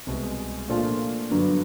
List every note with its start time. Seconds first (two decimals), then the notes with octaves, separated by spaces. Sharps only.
0.07 C2 B2 G#3
0.69 A#2 F3 A3 D4 F4
1.31 G2 D3 F#3 B3